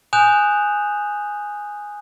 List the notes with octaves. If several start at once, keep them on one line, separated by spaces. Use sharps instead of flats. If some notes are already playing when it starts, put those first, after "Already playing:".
G#5 D#6 F#6 G6 E7 F7